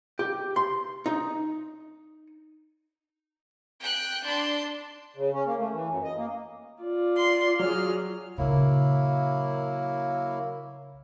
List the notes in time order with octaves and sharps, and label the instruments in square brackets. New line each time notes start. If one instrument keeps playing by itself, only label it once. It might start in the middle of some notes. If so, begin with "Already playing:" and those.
[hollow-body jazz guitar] G4
C6
D#4
[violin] G5 F#6
D4 C6
[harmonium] C#3
C#4
A#3
A3
E3
F#2
D#5
A#3
[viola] F4 D5
[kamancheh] C6
[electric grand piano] F#3 [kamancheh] G#4 F6
[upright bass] A#1 C#3 [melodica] F#3 A#3 E4